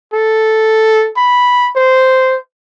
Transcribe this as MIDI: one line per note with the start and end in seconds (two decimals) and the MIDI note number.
0.13 1.09 69
1.17 1.70 83
1.76 2.37 72